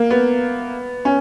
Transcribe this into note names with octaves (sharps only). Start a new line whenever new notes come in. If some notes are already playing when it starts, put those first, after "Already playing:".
Already playing: A#3
B3
C#4